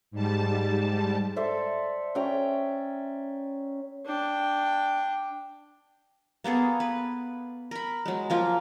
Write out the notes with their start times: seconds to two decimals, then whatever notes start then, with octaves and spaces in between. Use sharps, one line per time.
0.11 G#2 G3 A5
1.36 A4 C5 D5 E5
2.15 C#4 E5 G5 A#5
4.06 D4 G5
6.44 A#3 B3 G#4 A4
6.80 B4
7.71 A#4 B5
8.06 F#3 G#3
8.30 F3 A#3 F4